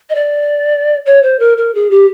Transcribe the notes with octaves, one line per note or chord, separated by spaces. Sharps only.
D#5
D5
C#5
C5
A#4
A#4
G#4
G4